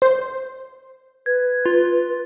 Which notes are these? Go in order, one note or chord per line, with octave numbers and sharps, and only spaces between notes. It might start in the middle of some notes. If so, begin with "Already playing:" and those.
C5
B4 G#6
F4